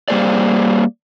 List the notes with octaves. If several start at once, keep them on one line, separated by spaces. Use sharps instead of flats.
G3 A#3 G#4 C5 D5